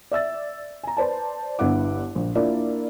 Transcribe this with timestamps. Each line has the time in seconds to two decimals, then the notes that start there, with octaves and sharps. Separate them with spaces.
0.12 D5 E5 E6 A6
0.83 G#5 A#5
0.97 B4 C5 D5 A5
1.59 G1 G2 B3 E4 F#5 D6
2.16 A#1
2.35 A#3 D4 E4 F4 A#4 D5